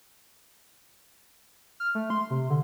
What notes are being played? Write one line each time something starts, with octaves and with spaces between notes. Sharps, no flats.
F6
A3
C6
C3
D3